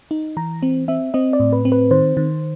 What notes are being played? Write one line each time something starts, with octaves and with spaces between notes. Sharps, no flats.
D#4
E3 A#5
C4
C4 E5
C4 D#5
D5
A2
B4
C4
B4
D#3 C5
D#3